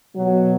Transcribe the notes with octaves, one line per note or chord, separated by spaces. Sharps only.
B2 F#3